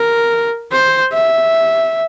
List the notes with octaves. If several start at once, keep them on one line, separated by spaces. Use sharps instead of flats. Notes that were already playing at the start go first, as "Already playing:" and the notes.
Already playing: A#4
C5
E5